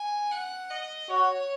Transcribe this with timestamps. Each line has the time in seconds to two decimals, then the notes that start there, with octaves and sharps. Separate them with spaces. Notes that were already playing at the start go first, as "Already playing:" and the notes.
Already playing: G#5
0.31 F#5
0.70 D#5
1.10 F#4 C#5